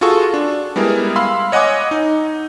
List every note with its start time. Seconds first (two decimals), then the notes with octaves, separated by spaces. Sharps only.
0.01 F4 F#4 G#4 A4 C#6
0.34 D4
0.76 G3 G#3 B3 E4 G#4 A#4
1.16 F5 B5 C6 E6
1.52 C#5 D#5 F#5 G#5 D6 D#6
1.91 D#4